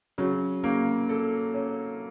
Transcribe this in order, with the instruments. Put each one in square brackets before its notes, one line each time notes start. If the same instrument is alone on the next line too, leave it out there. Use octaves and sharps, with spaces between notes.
[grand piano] C#3 [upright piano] F#3
[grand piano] C#3 [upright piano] A#3
[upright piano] A4
C#4